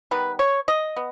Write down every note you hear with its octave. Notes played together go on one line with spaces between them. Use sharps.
D#3 G3 B3 B4
C#5
D#5
B3